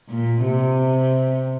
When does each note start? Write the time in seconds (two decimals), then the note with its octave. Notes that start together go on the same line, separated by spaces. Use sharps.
0.09 A#2
0.43 C3